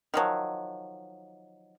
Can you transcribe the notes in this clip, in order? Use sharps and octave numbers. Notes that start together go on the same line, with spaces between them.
D#3 F3 F#3